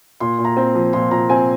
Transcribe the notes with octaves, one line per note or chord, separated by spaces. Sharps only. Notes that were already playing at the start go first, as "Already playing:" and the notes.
A#2 C6
A#2
A#5
C4
F3
A#2 C6
A#2 A#5
C4 G#5